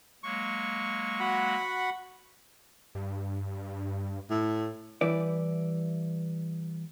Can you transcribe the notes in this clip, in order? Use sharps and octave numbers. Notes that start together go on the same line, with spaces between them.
F#3 G#3 A#3 C#6
F#4 F#5 B5
G2
A2
E3 G3 E4 B4 D5